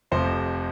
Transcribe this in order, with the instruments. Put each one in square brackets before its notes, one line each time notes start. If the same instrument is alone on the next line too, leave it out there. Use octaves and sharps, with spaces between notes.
[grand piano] F1 F2 C3 F3 C5